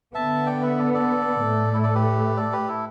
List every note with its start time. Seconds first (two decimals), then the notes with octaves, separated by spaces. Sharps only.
0.14 D3 B3 E5 A5
0.46 D5 G5
0.62 B4 E5
0.78 A4 D5
0.94 A4 D5
1.41 A2 A3
1.73 E4 A4
1.83 A4 D5
1.94 G4 B4
2.37 A4 D5
2.53 G4 B4
2.68 E4 A4